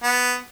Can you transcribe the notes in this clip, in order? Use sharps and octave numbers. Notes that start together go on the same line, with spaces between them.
B3